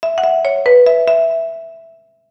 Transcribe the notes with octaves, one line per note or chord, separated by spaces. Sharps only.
E5
F#5
E5
C#5
B4
E5
E5